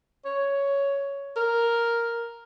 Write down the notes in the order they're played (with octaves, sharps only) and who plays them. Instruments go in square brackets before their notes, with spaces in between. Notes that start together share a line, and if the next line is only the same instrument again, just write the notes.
[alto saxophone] C#5
A#4